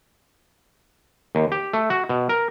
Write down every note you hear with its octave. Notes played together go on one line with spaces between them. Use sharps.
D#2
G4
A3
F#4
B2
A#4